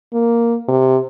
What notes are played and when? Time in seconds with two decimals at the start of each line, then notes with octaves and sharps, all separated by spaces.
0.13 A#3
0.68 C3